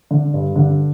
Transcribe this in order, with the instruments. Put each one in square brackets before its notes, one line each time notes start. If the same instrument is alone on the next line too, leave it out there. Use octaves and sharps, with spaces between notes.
[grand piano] D3
G2
D3